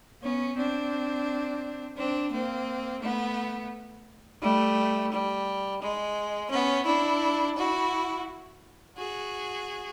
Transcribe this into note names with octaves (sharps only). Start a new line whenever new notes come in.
B3 C#4
C4 D4
C4 D4
A#3 C4
A3 B3
G3 A3
G3
G#3
B3 C#4
D4 E4
E4 F#4
F#4 G#4